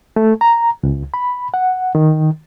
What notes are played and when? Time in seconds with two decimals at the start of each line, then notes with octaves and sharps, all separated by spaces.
0.16 A3
0.41 A#5
0.83 C#2
1.14 B5
1.54 F#5
1.95 D#3